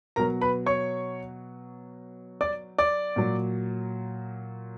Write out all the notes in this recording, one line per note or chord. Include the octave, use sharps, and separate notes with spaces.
B2 F#3 A#4 A#5
B4 B5
C#5 C#6
D5 D6
D5 D6
A#2 F#3